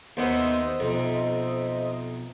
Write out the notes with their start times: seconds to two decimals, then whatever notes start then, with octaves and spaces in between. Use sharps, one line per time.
0.17 D#2 B3 C5 D#5 E5 F#5
0.80 B1 F2